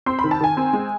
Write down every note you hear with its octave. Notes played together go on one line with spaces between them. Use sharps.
C4 C6
B5
D#3
A5
D#3 G#5
C4
G#3